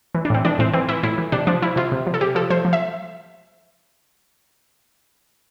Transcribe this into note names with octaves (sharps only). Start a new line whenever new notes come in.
E3
D4
A2 C4
E3 D4
A2 C4
E3 C4
E3 E4
A2 E4
E3
C3 D4
F3 D4
F3 E4
C3 F4
C3
F3
A4
C3 G4
F3 A4
F3 C5
F3
E5